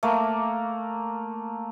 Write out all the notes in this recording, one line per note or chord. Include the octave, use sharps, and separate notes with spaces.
A3 A#3